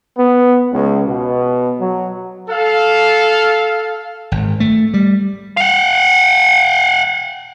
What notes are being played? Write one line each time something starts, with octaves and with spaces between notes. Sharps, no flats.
B3
C#2
B2
F#3
A4 F5
G#1
A3
G3
F5 F#5